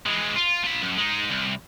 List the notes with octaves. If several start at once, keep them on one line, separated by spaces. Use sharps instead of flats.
E3 G#3
F4
F4 B5
F#2
G#3 D#4
C2